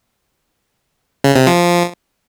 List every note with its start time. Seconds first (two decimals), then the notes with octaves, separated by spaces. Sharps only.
1.24 C#3
1.36 C3
1.47 F3